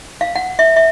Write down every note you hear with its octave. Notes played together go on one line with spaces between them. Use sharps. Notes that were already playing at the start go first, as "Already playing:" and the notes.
F5
F#5
E5
E5